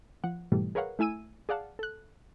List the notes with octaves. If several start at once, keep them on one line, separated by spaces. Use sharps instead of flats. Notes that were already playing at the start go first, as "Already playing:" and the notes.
F3 F#5
G#2 B2 E3 G3 A3
G#4 A#4 B4 C#5 F5 F#5
A3 E4 G#5 E6 D#7
G#4 D5 F5 F#5 A5
A4 F#6